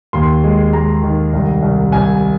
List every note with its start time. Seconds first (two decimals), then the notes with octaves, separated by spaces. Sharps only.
0.13 D#2 C6
0.44 G#3
0.73 G#3 A#5
1.02 D#3
1.33 C2
1.62 C2
1.92 C2 G#5